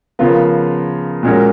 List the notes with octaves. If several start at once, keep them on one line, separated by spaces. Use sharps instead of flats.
C#3 F3 B3 F4 A#4
A#2 G#3 C#4 F#4 A#4